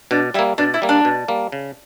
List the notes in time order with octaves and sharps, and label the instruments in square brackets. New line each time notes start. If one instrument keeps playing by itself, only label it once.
[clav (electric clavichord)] B2 [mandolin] D4
[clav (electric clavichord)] G3 [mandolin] E4
[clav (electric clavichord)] A#3
[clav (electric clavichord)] B2 [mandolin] D4
[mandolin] E4
[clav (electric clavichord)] G3 A#3
[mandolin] D4
[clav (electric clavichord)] B2
G3 A#3
C#3